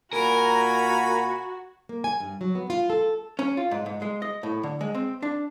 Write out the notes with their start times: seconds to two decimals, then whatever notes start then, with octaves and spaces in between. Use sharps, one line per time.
0.13 A#2 F#4 A#4 G#5 A#5 B5
1.89 A#3
2.04 G#5
2.20 G2
2.41 F#3
2.55 B3
2.70 F4
2.90 A4
3.39 C#4
3.57 F4
3.71 G#2
3.86 G#2
4.02 G#3
4.22 D#5
4.43 A2
4.63 D3
4.81 G#3
4.95 C4
5.22 D4